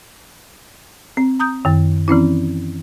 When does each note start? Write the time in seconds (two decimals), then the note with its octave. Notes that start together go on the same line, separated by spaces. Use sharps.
1.17 C4
1.40 A#5 D#6 G6
1.65 F#2 D#3
2.08 E3 C4 C#4 E4